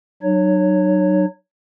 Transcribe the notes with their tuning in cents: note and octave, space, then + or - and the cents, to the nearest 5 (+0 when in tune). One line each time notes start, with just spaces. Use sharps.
F#3 +20 D#4 -40 C#5 +0